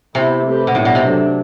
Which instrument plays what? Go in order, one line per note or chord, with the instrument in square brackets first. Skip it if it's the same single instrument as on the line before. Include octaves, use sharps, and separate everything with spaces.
[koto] C3 [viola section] B3 E4 G4
[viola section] A3 C4 G4 B4
[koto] B2
[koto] A2 [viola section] G3 B3 D4 G4
[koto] B2
C3
[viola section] F#3 A3 D4